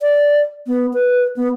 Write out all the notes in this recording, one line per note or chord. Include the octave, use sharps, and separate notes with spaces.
D5
B3
B4
B3